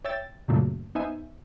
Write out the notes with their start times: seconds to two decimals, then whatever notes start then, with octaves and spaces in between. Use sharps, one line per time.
0.05 C#5 E5 G5 E6 A6
0.48 F#2 A#2 C#3 F#3 A3 A#3
0.95 B3 D#4 C5 E5 G#5